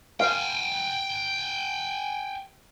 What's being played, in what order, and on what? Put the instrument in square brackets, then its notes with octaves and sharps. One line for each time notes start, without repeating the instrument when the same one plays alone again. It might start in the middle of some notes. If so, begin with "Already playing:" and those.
[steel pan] F5 [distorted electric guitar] G5 G#5